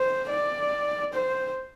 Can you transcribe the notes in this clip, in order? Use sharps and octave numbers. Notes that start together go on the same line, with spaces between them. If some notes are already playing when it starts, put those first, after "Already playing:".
Already playing: C5
D5
C5